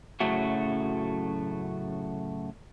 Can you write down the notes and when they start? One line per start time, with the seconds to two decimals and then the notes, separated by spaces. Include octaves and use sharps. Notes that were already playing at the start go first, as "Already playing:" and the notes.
0.20 F#2 A2 C#3 F#3 A3 F#4